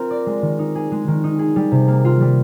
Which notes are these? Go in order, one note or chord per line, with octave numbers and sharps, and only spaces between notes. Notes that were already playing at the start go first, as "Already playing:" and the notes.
Already playing: C4 F4 A#4
D5
G#3
D#3
D#4
G#4
G#3
D#3
D#4
G#4
G3
C3
A#3
F4
G3